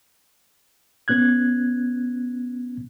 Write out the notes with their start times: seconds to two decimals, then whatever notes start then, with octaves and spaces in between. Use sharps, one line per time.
1.08 B3 C#4 F#6 G#6